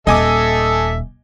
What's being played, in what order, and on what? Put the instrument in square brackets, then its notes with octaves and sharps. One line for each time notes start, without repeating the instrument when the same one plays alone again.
[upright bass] D#1 [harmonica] A4 E5 [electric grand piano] D#5 G#5 D6